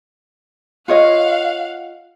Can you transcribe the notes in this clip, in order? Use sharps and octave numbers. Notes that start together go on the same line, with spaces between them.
F4 C#5 D#5 F5 F#5